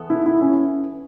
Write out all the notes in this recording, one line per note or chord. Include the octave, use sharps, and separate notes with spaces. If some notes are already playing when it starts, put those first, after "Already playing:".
Already playing: E2 B3 A4
E4
E4
C#4